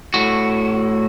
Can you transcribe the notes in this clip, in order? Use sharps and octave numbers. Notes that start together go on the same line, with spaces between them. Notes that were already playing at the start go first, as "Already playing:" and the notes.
A2 F#4